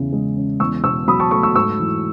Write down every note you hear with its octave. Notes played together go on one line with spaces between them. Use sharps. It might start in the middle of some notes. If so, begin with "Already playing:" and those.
Already playing: E2 C#3 E4
G#3
C#4
E2 C#6 E6
B2 C#6 E6
F#3 B5 D#6
A5 C#6
A3 A5 C#6
C#6 E6
G#2 C#6 E6
E3